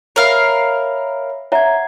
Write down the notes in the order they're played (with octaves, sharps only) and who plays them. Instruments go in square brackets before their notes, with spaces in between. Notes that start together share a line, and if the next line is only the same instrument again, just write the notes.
[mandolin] A#4 F5 [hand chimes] C#5 E5 B5
[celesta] C#5 E5 A#5 [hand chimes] F#5 G#6